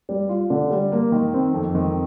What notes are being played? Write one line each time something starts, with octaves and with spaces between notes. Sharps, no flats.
G3
F4
D3
G3
A#3
D#3
C4
F2
D#3